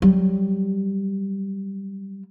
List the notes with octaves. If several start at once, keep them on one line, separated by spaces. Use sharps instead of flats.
F#3 G3